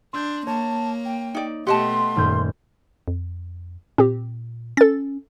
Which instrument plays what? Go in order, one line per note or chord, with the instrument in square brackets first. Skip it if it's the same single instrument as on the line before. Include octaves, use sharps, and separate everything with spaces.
[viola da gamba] D4 [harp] C6 E6 G6
[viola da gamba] A#3 [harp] C#5 [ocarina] A5
[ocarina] G5
[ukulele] D#4 D5
[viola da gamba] B2 A3 [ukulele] G4 D#5 A5 [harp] F#5 [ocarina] C6
[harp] D#1 F#2 G6
[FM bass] F2
[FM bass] A#2 [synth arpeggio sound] C4 G4
[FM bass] C#4 [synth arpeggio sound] A4 A6